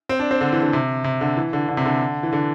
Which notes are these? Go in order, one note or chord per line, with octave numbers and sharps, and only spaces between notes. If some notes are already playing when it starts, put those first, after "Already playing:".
C4
D4
C4
D3
E3
D3
C3
C3
D3
E3
D3
D3
C3
D3
E3
D3